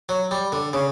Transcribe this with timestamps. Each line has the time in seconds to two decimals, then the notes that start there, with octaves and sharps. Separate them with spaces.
0.09 F#3
0.31 G3
0.52 D3
0.73 C#3